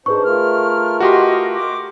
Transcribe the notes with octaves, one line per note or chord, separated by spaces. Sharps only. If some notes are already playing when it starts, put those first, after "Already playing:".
D4 D#4 G#4 B4 C5 C#6
A3 F4 A#4 F6
F#4 G4 D#5 C6
D6